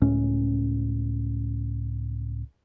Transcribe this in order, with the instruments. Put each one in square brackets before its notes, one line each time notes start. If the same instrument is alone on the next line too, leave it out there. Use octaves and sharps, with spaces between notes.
[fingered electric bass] C#2 A2 C#4